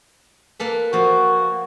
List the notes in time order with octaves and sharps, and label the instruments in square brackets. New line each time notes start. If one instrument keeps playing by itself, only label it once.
[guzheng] A#3 A4 B4
[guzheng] F3 A#3 [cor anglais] F#4